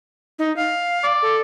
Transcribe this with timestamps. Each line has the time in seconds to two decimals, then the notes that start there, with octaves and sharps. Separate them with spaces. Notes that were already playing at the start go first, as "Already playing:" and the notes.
0.39 D#4
0.56 F5
1.03 D5
1.22 A4